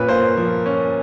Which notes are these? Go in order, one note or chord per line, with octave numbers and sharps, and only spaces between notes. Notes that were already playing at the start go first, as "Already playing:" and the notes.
Already playing: A#2 C#4 B4
A#3 C5
F3
C#4